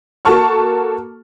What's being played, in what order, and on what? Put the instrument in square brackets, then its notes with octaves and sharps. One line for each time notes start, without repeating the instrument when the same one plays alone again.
[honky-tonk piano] A#3 F#4 A4 A5 C#6 F6